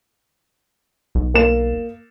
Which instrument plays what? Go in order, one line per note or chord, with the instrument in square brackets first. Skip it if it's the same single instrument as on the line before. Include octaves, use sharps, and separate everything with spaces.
[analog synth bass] B1
[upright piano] A#3 E7